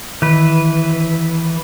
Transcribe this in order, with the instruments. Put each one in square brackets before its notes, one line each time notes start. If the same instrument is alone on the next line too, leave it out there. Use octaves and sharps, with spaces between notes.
[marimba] D#3 [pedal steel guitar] E3 B4